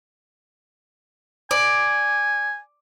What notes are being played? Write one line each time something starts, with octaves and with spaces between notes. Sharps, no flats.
D5 G#5